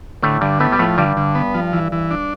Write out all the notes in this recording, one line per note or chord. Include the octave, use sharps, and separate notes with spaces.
A2 D3 A3
G2 D3 G3
A2 A3 B3
G3
A2 F3 A3
G2 D3 G3
D3
B3
F3
E3
E3
D4